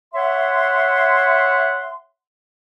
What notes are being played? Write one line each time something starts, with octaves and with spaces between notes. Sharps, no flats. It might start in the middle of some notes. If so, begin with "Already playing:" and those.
C#5 E5 F#5 C6